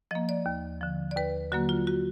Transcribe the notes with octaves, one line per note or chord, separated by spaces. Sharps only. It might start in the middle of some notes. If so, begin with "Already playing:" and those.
F3 A#3 D#5
D5
D#2
D3 F3
D5
D#2 B4
D3 F#3 A#3 F#4
F4
F#4